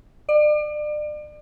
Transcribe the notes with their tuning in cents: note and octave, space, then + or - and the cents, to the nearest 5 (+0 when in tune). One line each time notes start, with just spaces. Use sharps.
D5 +35